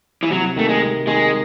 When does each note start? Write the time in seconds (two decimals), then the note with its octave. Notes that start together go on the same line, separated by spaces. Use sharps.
0.23 E3
0.30 C3 F#3
0.56 D#3 A3
0.69 G#3
0.82 C3
1.07 D#3 G#3